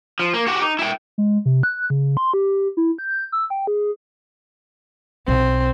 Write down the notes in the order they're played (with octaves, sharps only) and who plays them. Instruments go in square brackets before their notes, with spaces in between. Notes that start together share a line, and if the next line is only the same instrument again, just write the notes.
[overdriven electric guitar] F3
A#3
F#4 G4
D#4
E4 G5
[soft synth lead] G#3
C3
F#6
C#3
C6
G4
E4
G6
E6
G5
G#4
[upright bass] B1 [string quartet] C4